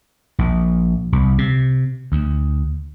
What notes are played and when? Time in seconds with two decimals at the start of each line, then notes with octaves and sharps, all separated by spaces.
0.39 A#1
1.12 C2
1.38 C3
2.12 D2